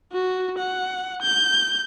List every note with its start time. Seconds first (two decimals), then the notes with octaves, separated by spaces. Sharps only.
0.12 F#4
0.58 F#5
1.22 G6